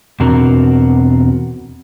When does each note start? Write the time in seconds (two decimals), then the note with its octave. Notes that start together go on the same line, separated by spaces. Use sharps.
0.20 E2 B2 C4 D4 F#4 A#4